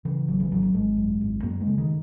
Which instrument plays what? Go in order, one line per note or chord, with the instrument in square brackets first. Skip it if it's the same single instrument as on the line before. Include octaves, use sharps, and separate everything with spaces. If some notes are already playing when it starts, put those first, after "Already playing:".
[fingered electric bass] C#3 E3
G#1 F#3
E3
G#1 F#3
F#3
G#1 G#3
F#2
G#1
F#2 A#3
G#3
C#3
D#3